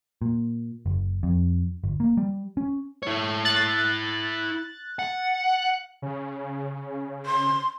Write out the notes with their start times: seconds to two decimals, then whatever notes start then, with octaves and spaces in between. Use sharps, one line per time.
0.22 A#2
0.86 F#1
1.23 F2
1.84 G1
2.00 A#3
2.17 G3
2.57 C#4
3.03 E4 C#5
3.45 F#6 A6
4.99 F#5
6.02 C#3
7.26 C6